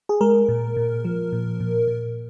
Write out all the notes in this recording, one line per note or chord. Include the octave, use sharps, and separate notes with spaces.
G#4
G#3 A#4
A#2
A#2
F3
A#2
A#2
A#2